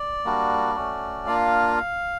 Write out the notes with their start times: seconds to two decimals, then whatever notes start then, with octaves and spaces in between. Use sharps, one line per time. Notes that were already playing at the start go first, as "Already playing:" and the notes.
Already playing: D5
0.25 G3 A#3 D4 F#4
0.76 A3 C#4 F#4
1.27 A#3 D4 F4 F5